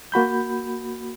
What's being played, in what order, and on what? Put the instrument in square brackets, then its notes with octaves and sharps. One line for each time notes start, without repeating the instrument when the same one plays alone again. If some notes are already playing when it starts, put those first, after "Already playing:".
[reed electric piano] A#3 F#4 B5 G6